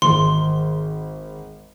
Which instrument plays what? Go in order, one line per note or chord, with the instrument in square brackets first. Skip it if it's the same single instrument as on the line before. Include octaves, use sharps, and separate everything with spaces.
[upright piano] G#1 [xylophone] C6